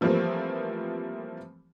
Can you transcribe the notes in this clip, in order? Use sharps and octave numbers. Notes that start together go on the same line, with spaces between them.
E3 F3 G3 A3 A#3 C4